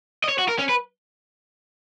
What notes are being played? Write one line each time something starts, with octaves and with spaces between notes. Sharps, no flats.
D#5
C#5
F#4
A#4
C#4
B4